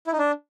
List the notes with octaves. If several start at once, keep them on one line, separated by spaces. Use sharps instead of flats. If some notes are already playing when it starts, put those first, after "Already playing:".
E4
D#4
D4